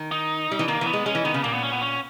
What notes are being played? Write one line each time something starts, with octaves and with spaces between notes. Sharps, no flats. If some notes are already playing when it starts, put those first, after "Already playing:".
Already playing: D#3
D#4
G3
E3
D#3 A#3
E3
B3
G#3
G#3 C#4
E3
D#3 B3
C#3
A#2 A#3
B3
C#4
B3
C#4